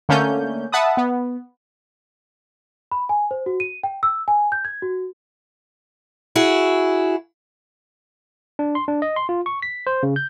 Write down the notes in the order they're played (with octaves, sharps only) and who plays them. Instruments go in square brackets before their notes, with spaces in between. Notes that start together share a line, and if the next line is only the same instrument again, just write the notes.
[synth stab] D3 A3 A#3 C#4 G6
E5 F#5 A5 B5 D#6
B3
[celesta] B5
G#5
C5
F#4
D#7
G5
E6
G#5
G6
G#6
F#4
[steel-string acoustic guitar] E4 F#4 G#4
[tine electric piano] D4
C6
D4
D#5
C6
F4
C#6
B6
C5
C#3
G6